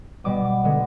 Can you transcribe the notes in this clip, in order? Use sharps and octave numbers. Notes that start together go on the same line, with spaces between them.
B2 G3 B3 D6
D6
D3 G#3 B3